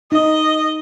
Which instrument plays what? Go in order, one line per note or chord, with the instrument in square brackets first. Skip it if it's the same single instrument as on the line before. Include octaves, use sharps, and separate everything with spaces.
[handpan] D#4 [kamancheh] D#5